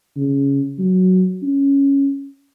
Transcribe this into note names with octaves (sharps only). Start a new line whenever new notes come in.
C#3
F#3
C#4